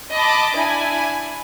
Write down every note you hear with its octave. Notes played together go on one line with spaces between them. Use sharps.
D#5 A5 B5 D6 D#6
D4 E4 G#5